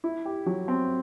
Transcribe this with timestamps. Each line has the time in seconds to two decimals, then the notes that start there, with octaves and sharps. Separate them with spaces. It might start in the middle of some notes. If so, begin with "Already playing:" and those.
0.04 E4
0.25 G4
0.46 F#3
0.68 C4